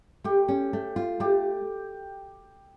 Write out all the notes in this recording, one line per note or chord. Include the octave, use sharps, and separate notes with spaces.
A3 G4
C#4
A3
F4
A3 G4